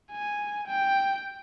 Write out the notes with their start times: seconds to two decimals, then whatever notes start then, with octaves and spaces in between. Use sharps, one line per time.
0.12 G#5
0.67 G5